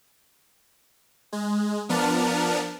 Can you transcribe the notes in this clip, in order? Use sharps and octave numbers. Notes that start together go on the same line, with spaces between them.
G#3
F3 B3 D4 A#4 A5 F6